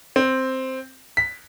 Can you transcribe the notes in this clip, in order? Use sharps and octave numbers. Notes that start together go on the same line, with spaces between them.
C4
B6